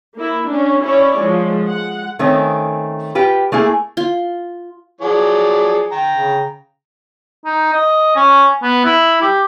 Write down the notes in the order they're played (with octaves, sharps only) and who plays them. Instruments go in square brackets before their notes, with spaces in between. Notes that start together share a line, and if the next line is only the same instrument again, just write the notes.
[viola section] A#3 E4
C#4 D4
C#4 E4 C#5 D5
F3 G#3
G#3 F#5
[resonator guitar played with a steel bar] D#3 A3 C4 C#4
F4 G4 B4
A3 A#3 E4 G#4
[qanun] F4
[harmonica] F3 F#3 D5 [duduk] G#4
[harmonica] G5 A#5
[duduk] C#3
[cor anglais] D#4
D#5
C#4
B3
E4
G4